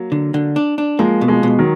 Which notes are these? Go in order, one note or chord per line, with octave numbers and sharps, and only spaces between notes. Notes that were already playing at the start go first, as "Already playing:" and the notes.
Already playing: F#3 A#3
D3
D3
D4
D4
F3 G#3 A#3
B2
F3 G#3
B2 G#3
D#3 F#3